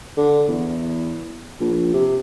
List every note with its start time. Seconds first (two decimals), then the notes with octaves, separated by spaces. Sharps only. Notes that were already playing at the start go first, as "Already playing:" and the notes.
0.17 D3
0.48 E2
1.60 A#1
1.94 C3